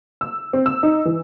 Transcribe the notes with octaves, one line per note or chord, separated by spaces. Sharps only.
E6
C4
E6
D#4
E3